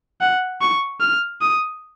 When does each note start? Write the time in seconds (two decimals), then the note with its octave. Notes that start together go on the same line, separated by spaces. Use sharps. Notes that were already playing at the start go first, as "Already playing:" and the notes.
0.21 F#5
0.61 C#6
1.01 F6
1.41 D#6